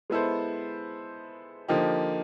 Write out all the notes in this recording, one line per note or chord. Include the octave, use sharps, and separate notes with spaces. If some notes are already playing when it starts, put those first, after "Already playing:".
G#3 B3 E4 A4 C5
D3 F3 A#3 D#4 G4